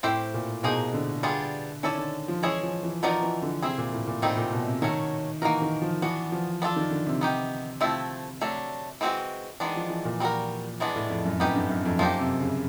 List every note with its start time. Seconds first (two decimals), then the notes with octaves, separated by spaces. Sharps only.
0.03 A2 C4 E4 G4 C5
0.34 A#2
0.63 B2 A#3 D#4 G#4 C5
0.94 D3
1.23 G3 B3 D4 F4 G#4
1.83 D#3 C#4 E4 A4 D5
1.97 D3
2.28 F3
2.43 E3 G#3 C#4 E4 G#4 C#5
2.63 F3
2.83 E3
3.03 F3 B3 D#4 F#4 A#4 D5
3.23 E3
3.42 D3
3.62 C3 C4 E4 G#4
3.78 A#2
3.93 A2
4.07 A#2
4.22 A2 D#3 G3 C4 D#4
4.37 A#2
4.53 B2
4.67 C3
4.82 D#3 F#3 A3 C#4
5.42 E3 A#3 D#4 F#4 A#4
5.62 D#3
5.82 F3
6.02 E3 B3 D4 F#4
6.32 F3
6.62 B3 D4 F4 A4
6.76 D#3
6.91 D3
7.06 C3
7.21 B3 D#4 G4
7.81 C3 F3 A3 C4 E4
8.41 F#3 A3 D4
9.01 E3 G#3 C4 D#4 F#4
9.60 D#3 E3 G#3 B3 D4
9.76 F3
9.90 E3
10.05 A#2
10.20 G3 C4 D#4 F#4 A#4
10.80 E3 G#3 B3 D4
10.96 A2
11.10 F2
11.25 F#2
11.40 F#2 B3 D#4 G4 B4
11.55 G2
11.69 F#2
11.85 F2
11.99 F#2 F3 A#3 D#4 G4
12.19 C3
12.40 C#3